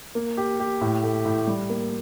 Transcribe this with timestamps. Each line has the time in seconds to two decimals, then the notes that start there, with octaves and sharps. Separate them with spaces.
0.15 A#3
0.37 G4
0.60 G4
0.81 A2
1.04 A3
1.25 A2
1.47 G3
1.70 A#3